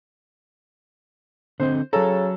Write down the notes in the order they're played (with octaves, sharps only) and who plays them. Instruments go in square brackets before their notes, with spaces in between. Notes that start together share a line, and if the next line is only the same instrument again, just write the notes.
[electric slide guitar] D3 C4 D#5 [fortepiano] C5
[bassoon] C#3 [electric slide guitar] F#3 A#5 [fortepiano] A4